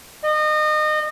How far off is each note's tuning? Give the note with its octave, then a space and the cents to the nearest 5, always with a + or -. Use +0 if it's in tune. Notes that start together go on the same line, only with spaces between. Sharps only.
D#5 -30